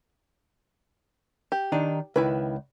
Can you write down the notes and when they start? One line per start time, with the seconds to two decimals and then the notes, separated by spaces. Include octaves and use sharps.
1.52 G4
1.72 D#3 D4 D#4
2.16 C#2 D#3 E4 B4